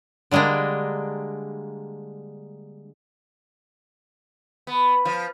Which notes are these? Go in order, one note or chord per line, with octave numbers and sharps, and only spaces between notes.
D3 G3 G#3 A#3 D4
B3
F3